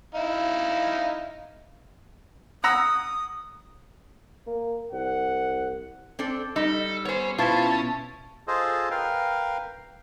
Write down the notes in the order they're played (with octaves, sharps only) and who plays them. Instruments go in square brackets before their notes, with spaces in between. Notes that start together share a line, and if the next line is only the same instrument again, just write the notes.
[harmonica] D#4 E4 F5
[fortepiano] F#5 A#5 E6 [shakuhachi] D#6
[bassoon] A#3
[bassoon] C2 [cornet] F#5
[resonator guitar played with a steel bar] C4 D4 A4
[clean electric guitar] G3 [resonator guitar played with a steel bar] D#4 [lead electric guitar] A4
[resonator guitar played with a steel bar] B3 C5 [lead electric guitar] C#5 G#5
[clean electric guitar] B2 E4 [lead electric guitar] C#4 [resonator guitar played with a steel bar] F4 B4 C5 [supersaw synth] A5
[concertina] F4 G#4 A4 C5 D#5
A#4 B4 F5 G5